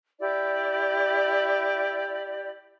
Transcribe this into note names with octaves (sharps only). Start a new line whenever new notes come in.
E4 G4 D5